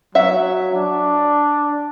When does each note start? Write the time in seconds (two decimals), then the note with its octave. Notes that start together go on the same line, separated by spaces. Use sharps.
0.15 F#3 E5 F#5
0.75 D4